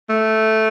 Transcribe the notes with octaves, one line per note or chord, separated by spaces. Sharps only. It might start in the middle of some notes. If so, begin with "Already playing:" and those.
A3